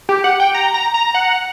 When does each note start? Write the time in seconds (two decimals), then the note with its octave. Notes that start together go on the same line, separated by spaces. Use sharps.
0.09 G4
0.24 F#5
0.40 G5
0.54 A#5
0.74 A#5
0.94 A#5
1.15 F#5